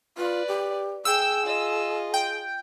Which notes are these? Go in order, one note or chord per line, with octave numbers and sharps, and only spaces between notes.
F4 B4 D5
G4
G#4 G5 E6
F4 D#5
G5